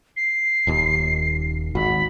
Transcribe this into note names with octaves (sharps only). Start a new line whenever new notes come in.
C7
D#1 D#2
G#1 F#4 B5